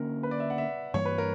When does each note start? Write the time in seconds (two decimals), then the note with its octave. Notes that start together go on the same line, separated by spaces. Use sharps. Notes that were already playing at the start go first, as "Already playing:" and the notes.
Already playing: D3 A#3 C#4 A#4
0.23 B4
0.31 D5
0.40 E5
0.50 F#5
0.58 E5
0.94 G2 E3 G3 A#3 C#5
1.06 B4
1.18 A#4